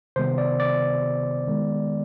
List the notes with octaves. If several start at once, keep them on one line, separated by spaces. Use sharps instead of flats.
C3 D#3 G3 B3 C5
D5
D5
D#3 G#3 B3